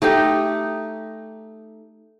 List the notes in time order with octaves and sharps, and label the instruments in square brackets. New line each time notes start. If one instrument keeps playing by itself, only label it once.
[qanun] A3 D#4 G4